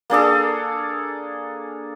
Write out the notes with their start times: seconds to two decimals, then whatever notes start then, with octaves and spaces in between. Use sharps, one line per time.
0.10 A#3 D4 G#4 A4